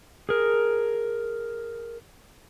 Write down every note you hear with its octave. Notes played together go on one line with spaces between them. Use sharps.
G#4 A#4